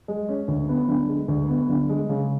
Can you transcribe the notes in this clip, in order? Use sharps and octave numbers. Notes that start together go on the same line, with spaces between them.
G#3
C#4
D2
B3
D3
G#3
D2
B3
D3
G#3
C#3